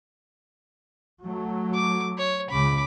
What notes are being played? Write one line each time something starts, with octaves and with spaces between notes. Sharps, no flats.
F#3 A3
D6
C#5
C#2 C#3 B5 D6